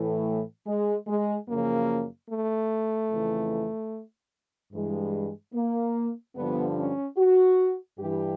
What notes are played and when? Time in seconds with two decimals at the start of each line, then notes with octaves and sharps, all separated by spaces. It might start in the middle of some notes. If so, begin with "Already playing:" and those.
Already playing: A2 E3 A3
0.67 G#3
1.07 G#3
1.47 F#2 C#3 F3 A#3
2.29 A3
3.11 F2 C#3 E3
4.73 G2 E3 G#3
5.54 A#3
6.36 G2 D3 F3 B3
6.77 C#4
7.17 F#4
7.99 G2 E3 G4